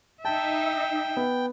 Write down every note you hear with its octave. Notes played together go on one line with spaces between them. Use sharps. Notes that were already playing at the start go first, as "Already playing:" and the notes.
D#4 E5 G5 A5
B3